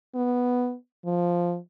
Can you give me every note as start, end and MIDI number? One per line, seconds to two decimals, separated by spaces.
0.15 0.75 59
1.05 1.57 53